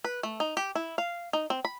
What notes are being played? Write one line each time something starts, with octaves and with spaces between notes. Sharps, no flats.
B4
A3
D#4
G4
E4
F5
D#4
C4
B5